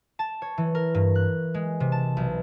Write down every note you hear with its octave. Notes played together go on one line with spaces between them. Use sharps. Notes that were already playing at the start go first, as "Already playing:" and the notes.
A5
C#5
E3
A#4
G2
F#6
G#3
C3
A5
B1